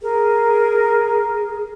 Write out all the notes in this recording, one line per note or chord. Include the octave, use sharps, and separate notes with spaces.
G#4 A#4